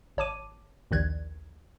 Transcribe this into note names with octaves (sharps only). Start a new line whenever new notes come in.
G#1 C#5 A5 D6 D#7
A#1 D#2 D#3 D5 F#6 G#6